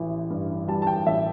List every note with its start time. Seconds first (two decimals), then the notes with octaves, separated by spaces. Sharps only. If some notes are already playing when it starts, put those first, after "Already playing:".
Already playing: A1 E3
0.30 G2
0.68 G3 A5
0.82 A5
0.87 G5
1.06 A1 E5